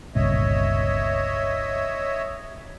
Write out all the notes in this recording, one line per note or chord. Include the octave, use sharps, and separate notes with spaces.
G1 C#2 A#2 C#5 D#5 E5